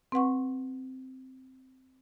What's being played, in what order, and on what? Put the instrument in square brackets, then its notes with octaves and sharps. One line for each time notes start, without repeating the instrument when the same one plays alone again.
[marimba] C4 B4 F#5 C#6